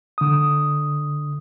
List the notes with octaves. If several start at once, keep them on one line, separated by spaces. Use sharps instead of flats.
D3 D#6